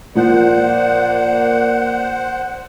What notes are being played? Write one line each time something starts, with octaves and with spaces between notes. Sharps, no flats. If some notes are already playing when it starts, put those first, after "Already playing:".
A#2 F3 A#3 C5 D5 F#5